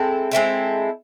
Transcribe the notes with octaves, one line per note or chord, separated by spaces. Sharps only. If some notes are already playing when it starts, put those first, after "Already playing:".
Already playing: G#3 C4 E4 A4
G#3 C4 E4 A4